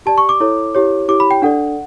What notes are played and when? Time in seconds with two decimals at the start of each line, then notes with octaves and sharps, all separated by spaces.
0.06 G4 D5 A5
0.18 C#6
0.29 D6
0.40 E4 A4 C#5
0.75 E4 G4 C#5
1.08 E4 G4 C#5 D6
1.20 B5
1.31 G5
1.42 D4 A4 D5 F#5